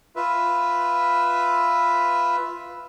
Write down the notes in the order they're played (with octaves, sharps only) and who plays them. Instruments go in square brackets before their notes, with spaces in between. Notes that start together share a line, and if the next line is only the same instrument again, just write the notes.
[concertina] F4 B4 E5